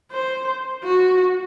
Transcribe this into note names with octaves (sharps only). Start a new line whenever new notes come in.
C5
F#4